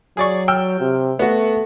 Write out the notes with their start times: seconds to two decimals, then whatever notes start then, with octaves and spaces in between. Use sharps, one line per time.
0.17 F#3 G#4 D5 C#6
0.48 G5 E6 F6
0.80 C3
1.19 A3 B3 F#4